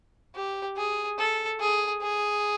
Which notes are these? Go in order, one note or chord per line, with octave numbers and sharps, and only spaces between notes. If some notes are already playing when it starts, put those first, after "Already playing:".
G4
G#4
A4
G#4
G#4